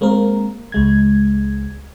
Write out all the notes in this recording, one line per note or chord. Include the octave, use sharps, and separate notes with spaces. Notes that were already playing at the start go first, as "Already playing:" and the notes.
G#3 A#3 C4 A#4
C#2 G#3 G#6